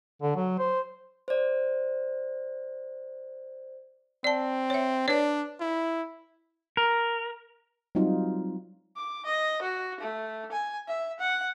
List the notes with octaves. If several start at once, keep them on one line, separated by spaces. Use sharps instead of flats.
D3
F#3
C5
C5 D5
C4 D5 A5
C#5 E5
D4 B4 C#5 D5
E4
A#4
F#3 G3 C4 D#4 F4
D6
D#5
F#4
A3
G#5
E5
F#5